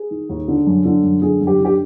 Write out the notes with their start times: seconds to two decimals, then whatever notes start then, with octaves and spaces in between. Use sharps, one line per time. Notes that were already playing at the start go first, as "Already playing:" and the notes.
Already playing: G#4
0.11 D#3
0.30 D#2
0.48 D3
0.67 F#2
0.85 D3
1.03 F#2
1.22 D3 G#4
1.41 F#2
1.47 G4
1.60 D3 G4